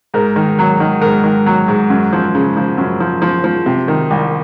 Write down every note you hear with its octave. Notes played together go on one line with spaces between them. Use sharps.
G#2 A#4
D#3
F#3
D#3
G#2 A#4
D#3
F#3
G#2
F#2
F3
C#3
F3
F#2
F3
F3
F3
C3
D#3
C2